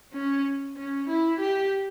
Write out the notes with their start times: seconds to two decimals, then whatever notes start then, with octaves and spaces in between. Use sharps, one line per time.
0.13 C#4
0.77 C#4
1.09 E4
1.40 G4